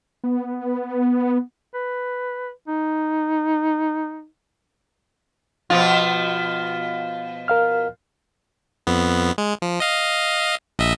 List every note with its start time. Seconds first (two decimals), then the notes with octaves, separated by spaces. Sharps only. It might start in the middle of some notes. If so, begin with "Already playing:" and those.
0.24 B3
1.74 B4
2.68 D#4
5.70 B2 F3 F4
7.48 A#4 F5 F6
8.87 F2 B3
9.38 G#3
9.62 F3
9.80 D#5 F5
10.79 A#1 D#5 E5